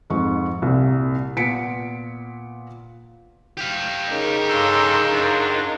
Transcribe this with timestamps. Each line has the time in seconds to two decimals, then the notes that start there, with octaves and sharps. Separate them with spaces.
0.10 F2 G#2 C#6
0.62 C2 A#2
1.36 A#2 B3 F4 B6 C#7 D7
3.57 G4 F5
4.11 C#3 D#4 A#4
4.48 G2 A4 C6
5.11 F#2 D4 F4